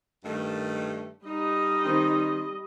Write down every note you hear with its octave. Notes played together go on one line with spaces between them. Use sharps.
G2 D#3 A3
G3 D#4 D#5
D#3 C4